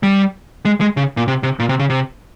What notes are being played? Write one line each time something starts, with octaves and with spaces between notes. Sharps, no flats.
G3
G#3
G#3
C#3
A#2
C3
C3
A#2
C3
C#3
C3